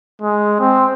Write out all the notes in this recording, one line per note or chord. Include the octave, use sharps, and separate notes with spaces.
G#3
C4